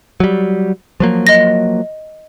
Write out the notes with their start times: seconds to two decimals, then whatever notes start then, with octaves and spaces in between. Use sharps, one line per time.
0.20 F#3 G3
1.00 F3 F#3 A#3
1.27 D#5 A#6